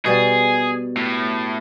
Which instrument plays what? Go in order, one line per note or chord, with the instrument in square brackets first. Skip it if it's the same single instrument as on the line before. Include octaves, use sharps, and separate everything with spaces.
[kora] B2 G3 B3 [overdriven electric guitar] G#4
[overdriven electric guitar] A2